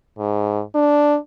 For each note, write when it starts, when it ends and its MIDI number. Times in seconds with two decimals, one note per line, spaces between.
0.18 0.62 44
0.75 1.17 62